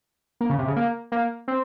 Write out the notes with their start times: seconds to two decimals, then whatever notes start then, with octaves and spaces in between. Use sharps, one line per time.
0.41 A#3
0.50 C#3
0.59 C3
0.68 C#3
0.76 A#3
1.12 A#3
1.48 C4